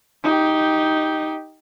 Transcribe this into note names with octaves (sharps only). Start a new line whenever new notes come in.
D#4 G4